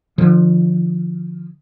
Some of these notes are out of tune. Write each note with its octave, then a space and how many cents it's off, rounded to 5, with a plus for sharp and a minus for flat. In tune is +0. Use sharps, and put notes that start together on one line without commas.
D3 +35 F3 +0